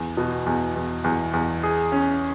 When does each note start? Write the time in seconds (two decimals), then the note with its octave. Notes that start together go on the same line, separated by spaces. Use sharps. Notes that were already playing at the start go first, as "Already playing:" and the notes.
Already playing: E2
0.17 B2
0.46 E2
0.76 E2
1.04 E2
1.33 E2
1.63 G#4
1.92 C#4